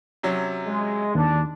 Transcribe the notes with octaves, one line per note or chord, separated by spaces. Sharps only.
C3 F#3 C#4
G#3
D#2 D4